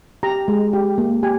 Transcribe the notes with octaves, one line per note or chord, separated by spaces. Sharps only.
G4 A#5
G#3
G4
A#3
G4 G#5